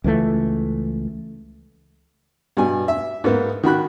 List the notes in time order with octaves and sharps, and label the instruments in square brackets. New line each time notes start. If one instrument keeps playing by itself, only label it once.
[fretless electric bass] C#2 E3 F#3 A3
[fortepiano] G2 B2 G#5
E5
G#2 A#3 B3
D#3 F#4 B5 F#6